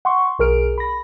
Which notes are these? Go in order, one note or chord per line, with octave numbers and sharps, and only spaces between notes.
F#5 C6 C#6
B1 G#4 A#4 F6 D7
B5 A#6